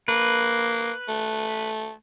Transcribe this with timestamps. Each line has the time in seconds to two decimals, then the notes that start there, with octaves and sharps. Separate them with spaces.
0.08 A#3 B4
1.08 A3